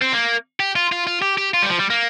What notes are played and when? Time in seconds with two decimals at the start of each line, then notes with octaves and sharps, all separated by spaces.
0.02 C4
0.13 A#3
0.60 G4
0.76 F4
0.92 F4
1.07 F4
1.22 G4
1.38 G4
1.54 F4
1.62 G3
1.69 F3
1.79 G3
1.90 A#3